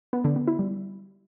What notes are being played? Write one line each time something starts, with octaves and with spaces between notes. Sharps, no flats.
B3
D3
B3
E4
G3